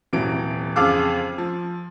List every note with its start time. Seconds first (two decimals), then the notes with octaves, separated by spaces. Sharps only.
0.13 D#1 C3 E3 F#3 D7
0.76 F2 C#3 G#4 F5 D6 E6
1.38 F3